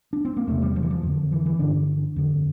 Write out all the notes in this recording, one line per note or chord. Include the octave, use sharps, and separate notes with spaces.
D4
C4
A#3
E2 C3 A3
G3
F3
E3
F3
F2 D3
E3
E3
G2 D3 D4
F2 D3